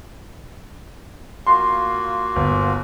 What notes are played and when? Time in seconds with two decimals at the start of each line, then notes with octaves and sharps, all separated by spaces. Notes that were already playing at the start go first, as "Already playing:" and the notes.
1.47 A#3 F4 F#4 C6
2.36 G1